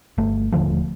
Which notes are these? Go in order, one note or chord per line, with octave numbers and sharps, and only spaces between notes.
G1 A3
D#1 D3 F3 A3